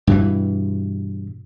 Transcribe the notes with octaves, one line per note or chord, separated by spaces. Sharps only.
G2 B2 E3